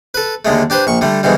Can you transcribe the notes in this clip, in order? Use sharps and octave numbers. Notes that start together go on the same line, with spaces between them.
A4 B4
D#2 D3 G#3 A3
D4 G4 B4 C5
A#1 C#6
D3 G3 A3
G#2 B2 D3 E3 G3